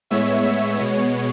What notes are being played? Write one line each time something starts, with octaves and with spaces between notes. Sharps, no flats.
A2 G#3 B3 C#5 E5
B2 G#3 B3 C#5